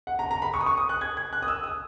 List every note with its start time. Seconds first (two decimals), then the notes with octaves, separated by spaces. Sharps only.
0.07 F#5
0.19 A#5
0.31 A#5
0.42 B5
0.54 C#6
0.61 D#6
0.66 C#6
0.77 D#6
0.89 F#6
1.01 G#6
1.17 G#6
1.33 F#6
1.42 D#6
1.48 E6
1.64 D#6